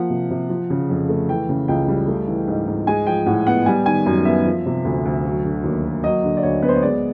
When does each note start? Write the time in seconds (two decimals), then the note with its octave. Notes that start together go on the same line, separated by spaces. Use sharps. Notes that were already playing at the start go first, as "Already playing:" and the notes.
Already playing: F3 A#3 F#5
0.10 C3
0.30 C3
0.50 F3
0.70 C#3
0.90 F2
1.09 A3
1.29 E3 G5
1.49 C#3
1.68 C#2 G5
1.88 G3
2.08 A3
2.28 E3
2.48 G#2
2.67 G#2
2.87 G#3 G#5
3.07 F3 G5
3.26 A2 F#5
3.47 B3 F#5
3.66 G3 G#5
3.86 D#3 G#5
4.06 F#2
4.25 B3 E5
4.45 F3
4.66 C3
4.85 D2
5.05 D2
5.25 F#3
5.44 D3
5.64 D#2
5.85 A#3
6.03 F#3 D#5
6.24 D3
6.37 D5
6.43 D2 C#5
6.62 B3 B4
6.69 C5
6.76 C#5
6.83 G#3 D5